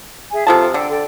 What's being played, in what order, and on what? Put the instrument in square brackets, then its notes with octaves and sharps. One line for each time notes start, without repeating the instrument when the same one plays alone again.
[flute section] G#4 E5 G#5
[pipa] C3 F3 A5 [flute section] F4 A4
[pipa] D3 [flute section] G5 E6
[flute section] A4 D5 G5